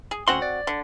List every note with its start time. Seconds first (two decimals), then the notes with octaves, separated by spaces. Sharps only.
0.11 G#4
0.28 D2 C4 C#4 F#4 F#5 C6
0.42 D5
0.67 D3